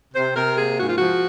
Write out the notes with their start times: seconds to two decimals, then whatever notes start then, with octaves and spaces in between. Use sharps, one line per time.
0.14 C3 C5
0.36 C3 A#4
0.58 A#3 G#4
0.79 G#2 F#4
0.88 F4
0.96 F3 F#4